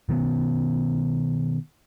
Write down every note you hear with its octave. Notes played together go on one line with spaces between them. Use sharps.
B2 D#3 B3